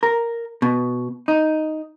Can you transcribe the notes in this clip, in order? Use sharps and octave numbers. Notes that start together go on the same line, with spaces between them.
A#4
B2
D#4